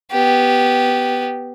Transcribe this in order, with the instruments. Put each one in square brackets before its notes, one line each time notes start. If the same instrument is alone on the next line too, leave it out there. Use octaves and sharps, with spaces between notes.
[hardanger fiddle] B3 G4